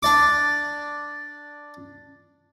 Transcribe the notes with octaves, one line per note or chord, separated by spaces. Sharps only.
D4 D5 D6